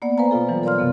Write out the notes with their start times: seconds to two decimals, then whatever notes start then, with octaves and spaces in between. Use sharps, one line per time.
0.02 A#3 B3 D5 F#5
0.18 B4 C5 D5 F5 G#5 A#5
0.31 B2 A#3 F4 A4
0.49 E3 F#3 G3
0.63 A#4 C#5 D5 F5 C6 F6
0.79 F#2 C3 B3